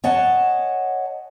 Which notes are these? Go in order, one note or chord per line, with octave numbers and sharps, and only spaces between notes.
C#5 D#5 F#5 G#5 A5